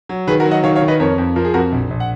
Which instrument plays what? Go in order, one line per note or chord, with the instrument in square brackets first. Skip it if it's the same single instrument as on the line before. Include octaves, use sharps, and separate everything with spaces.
[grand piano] F#3
D#3 G#4 B4
F#4 A#4
F#3
D#5 F#5
D#3 C#5 F5
C#5 F5
D#3
B4 D#5
F2 A#4 C#5
F2
F3 A#4
G#4
F2 F#4 A#4
A#1
A#1
F#5